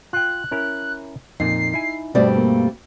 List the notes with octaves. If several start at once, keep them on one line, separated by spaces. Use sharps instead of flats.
F4 G5 F#6
C#4 E4 A#4
F2 A#2 D#4 C7
E4 G#5
G2 B2 G3 A3 C4 D5
A#3